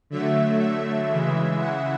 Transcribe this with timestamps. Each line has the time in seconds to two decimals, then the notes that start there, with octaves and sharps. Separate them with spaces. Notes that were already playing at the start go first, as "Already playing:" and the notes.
0.10 D3 F#3 A3 E5
0.60 E5
1.09 C#3 E3 G#3
1.59 F#5